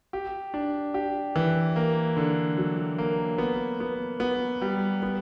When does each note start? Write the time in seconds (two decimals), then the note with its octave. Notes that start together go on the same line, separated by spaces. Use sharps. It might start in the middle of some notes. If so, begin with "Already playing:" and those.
0.13 G4
0.54 D4
0.94 G4
1.36 E3
1.76 A#3
2.17 D3
2.57 F#3
2.98 A#3
3.38 B3
3.80 B3
4.20 B3
4.62 G3
5.03 B3